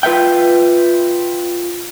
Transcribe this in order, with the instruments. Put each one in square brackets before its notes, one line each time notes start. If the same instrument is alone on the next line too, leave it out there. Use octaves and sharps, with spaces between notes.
[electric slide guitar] F4 B4 E5 G5